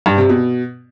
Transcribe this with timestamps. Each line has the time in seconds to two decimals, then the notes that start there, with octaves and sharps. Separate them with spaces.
0.06 G2
0.18 C3
0.29 B2